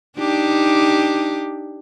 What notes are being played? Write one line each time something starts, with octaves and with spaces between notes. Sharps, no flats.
D4 D#4 G4